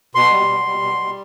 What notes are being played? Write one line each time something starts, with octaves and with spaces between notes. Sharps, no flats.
B2 C6
G3
B2
G3
B2
G3